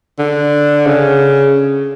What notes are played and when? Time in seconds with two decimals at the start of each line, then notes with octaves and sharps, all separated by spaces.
0.19 D3
0.87 C#3